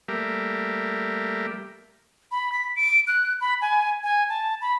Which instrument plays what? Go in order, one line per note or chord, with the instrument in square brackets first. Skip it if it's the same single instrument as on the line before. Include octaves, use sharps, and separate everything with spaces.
[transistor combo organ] G3 A3 A#3 G4 A#4 E5
[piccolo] B5
B6
D7
F#6
B5
G#5
G#5
A5
B5